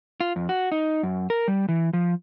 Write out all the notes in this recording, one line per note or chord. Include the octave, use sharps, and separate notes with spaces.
F4
F2
F#4
D#4
F#2
A#4
G3
E3
F3